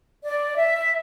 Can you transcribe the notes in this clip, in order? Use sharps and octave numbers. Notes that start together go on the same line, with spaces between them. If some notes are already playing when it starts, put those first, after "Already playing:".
D5
E5